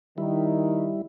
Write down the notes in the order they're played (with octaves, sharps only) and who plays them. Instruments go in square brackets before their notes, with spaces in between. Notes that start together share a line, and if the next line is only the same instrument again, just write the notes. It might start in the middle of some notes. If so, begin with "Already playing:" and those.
[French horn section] D#3 [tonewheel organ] G3 E4